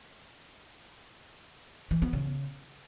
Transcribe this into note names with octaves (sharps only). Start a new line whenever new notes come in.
E3
B3
C#3